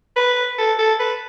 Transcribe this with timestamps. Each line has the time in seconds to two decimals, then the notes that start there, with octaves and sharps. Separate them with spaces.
0.16 B4
0.58 A4
0.79 A4
0.99 B4